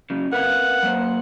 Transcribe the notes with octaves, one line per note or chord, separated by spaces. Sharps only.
C#3 F#3
A#4 B4 F5 F#5
F#3 A#3 C5